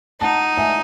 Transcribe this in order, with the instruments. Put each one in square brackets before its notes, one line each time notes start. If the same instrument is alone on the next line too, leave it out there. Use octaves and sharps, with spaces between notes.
[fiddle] D#4 [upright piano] F#5 A5
[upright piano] E5 G#5